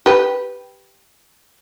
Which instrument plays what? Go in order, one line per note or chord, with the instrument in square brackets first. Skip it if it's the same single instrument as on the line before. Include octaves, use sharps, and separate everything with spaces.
[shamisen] G4 B4